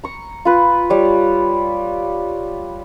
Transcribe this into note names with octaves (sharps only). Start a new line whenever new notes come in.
A#5 C#6
F4 B4
G3 C#5